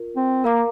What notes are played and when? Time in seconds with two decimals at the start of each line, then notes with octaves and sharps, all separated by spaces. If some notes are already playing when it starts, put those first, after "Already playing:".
Already playing: F4 A#4
0.16 C4
0.44 A#3 A#4 F5 A#5 D6